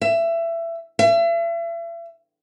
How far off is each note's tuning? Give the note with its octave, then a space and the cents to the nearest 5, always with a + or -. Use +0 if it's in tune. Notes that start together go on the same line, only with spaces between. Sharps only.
E5 +20
E5 +40